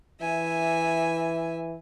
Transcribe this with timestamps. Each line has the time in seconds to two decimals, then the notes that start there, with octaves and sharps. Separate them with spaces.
0.22 E3 E5 G#5